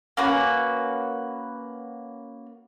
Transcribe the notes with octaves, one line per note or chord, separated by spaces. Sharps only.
A#3 C#4 F#4 B4